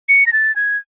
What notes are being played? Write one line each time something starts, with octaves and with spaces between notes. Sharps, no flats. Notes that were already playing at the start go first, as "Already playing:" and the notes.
C#7
A#6
A6
G#6